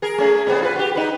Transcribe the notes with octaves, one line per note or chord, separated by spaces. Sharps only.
G#4 A#4
A3 C#4 G#4
A2 C3 B3
F4 B4
F#4 G4
D#4 B4